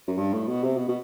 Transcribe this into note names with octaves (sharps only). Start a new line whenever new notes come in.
F#2
G2
A2
B2
C3
B2
B2